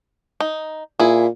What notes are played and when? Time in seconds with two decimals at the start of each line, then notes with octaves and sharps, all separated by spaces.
0.40 D#4
1.00 A#2 E4 G#4